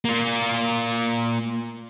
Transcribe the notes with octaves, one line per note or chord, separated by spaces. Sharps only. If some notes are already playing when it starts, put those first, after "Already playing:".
A#3 F4